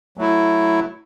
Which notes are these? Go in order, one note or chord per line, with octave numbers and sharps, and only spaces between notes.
F#3 A3 E4